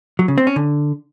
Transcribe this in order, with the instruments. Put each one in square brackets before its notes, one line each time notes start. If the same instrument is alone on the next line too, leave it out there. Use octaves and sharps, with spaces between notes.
[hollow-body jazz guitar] F#3
C#3
C4
C#4
D3